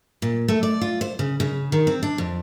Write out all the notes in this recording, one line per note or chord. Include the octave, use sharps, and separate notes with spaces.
A#2
A3
D5
F4
C5
C#3
C#3
D#3
C4
D4
F2